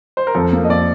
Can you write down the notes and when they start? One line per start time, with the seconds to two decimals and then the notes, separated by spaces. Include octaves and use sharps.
0.17 C5
0.27 A#4
0.35 F2 A4
0.53 A#3
0.64 D#5
0.69 F2 D5